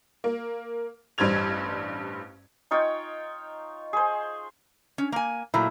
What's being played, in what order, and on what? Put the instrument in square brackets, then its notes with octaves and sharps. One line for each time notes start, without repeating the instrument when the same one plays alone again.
[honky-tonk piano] A#3
A1 G2 G3 C5 G#6 F7
[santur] D#4 F4 C#5 G5
G#4 C5
[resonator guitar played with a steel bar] C#4
A#3 G#5
[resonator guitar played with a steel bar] A#2 F#3 A3 [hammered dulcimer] E4